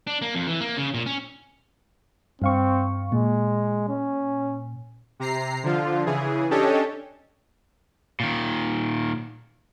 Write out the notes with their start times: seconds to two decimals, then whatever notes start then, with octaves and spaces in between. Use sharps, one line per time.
0.07 D4
0.22 A#3
0.35 F2
0.47 E3
0.61 A#3
0.77 C#3
0.94 A#2
1.06 C#4
2.42 G2 C4 F5 C#6
3.12 A#2 G#3
3.89 C#4
5.20 C3 A#5 C7
5.63 D3 F3 F4
6.06 C#3 E3 G#4
6.50 C#4 D4 G4 A4 C#5 D#5
8.20 A#2 D#3